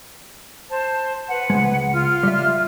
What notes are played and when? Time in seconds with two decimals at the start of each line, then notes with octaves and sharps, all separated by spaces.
0.70 C5 A5
1.29 B4 F#5
1.50 C#2 G#3
1.93 F4 F6
2.23 G3 E5